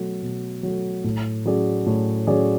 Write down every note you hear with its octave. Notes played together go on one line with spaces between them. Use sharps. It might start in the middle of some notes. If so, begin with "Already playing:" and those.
Already playing: B2 F#3 A3
B2
F#3 A3
A2
F#3 C#4 G#4 D5
A2
F#3 C#4 G#4 D5